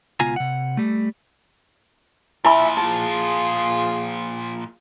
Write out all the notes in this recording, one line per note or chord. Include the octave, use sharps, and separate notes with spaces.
C#2 B2 F4 G#5 A#5
C3 F#5
G3 A3
A#2 F3 E4 E5 G#5 B5
F4 G#4 A5